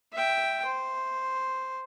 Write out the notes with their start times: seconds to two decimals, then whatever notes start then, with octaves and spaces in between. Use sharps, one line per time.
0.13 E5 G5
0.65 C5